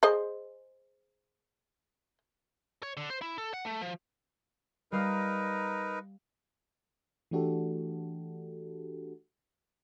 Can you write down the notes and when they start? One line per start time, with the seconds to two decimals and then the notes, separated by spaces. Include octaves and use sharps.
0.03 G#4 C5 D#5
2.83 C#5
2.97 D3
3.10 C5
3.22 E4
3.38 A4
3.54 F#5
3.65 A3
3.82 F3
4.92 G3 D#4 A#4 B4 F5 D#6
7.31 E3 A3 D4 F#4 G4 A4